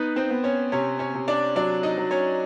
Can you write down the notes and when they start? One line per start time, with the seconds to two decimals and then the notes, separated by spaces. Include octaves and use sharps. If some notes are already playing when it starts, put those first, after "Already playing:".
Already playing: B3 D#4 B4
0.16 C4 C5
0.30 B3
0.44 C#4 C#5
0.72 C3 C#4 C#5
0.99 C#4 C#5
1.14 C3
1.28 D4 D5
1.56 F#3 D4 D5
1.83 D#4 D#5
1.98 F#3
2.11 C#4 C#5